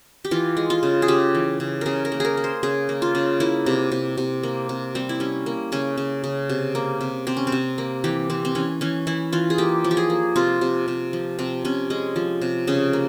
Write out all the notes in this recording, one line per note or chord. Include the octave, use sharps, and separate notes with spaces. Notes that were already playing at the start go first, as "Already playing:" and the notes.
G4
E3 F4
G#3
F4
C#3
G#4
C#3 G4
E3
C#3
C#3 G#4 A#4
A#4
A#3
G#4 A#4
A#3
C5
C#3 G#4
A#3
F4
C#3
A#3 E4
C3
C3
C3
A#3
C3
G3 C4
E4
G3 C#4
A#3
C#3 C#4
C#3
C#3
C3
A#3
C3
C3 C4
C#4
C4
C3
A#3
E3 G4
E3 C4
C4
E3 C#4
E3 C#4
E3 E4
E3 F4
G#4
A#3 G4
F3
G4
G#4
A#3
C3 F4
C3
C3
F3
C3 C4
C3 C#4
G#3 C#4
F3
C3
C#3 C#4
A#3